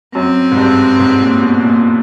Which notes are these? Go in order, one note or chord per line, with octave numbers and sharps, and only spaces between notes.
F#2 C4
G#2
G2
G#2
A#2
B2
A#2